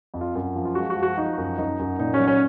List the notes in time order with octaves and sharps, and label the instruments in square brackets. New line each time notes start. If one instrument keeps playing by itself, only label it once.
[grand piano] F2
F4
F#2
F3
F4
G#3 F#4
F#4
F3
F#4
F3 D#4
F#2
F#2 D#4
F#2
A#2 D#4
C#4
F#3
C#4